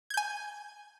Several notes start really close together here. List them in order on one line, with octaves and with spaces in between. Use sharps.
G#6 G6 G#5